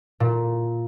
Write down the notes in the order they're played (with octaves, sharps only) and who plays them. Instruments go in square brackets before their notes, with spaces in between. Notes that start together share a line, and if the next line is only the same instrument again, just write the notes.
[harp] A#2